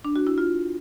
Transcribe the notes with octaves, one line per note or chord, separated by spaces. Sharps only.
D4
F#4
E4
F4